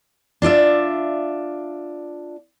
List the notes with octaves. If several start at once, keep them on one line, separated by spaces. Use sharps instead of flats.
D4 F4 D5 E5